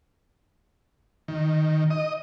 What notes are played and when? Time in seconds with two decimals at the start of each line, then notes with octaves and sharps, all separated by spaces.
1.28 D#3
1.90 D#5